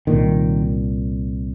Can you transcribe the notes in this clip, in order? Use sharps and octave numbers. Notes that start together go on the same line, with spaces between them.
C2 A#2 D#3